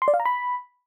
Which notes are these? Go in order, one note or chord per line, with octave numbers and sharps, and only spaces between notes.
C6
D5
F5
A#5
B5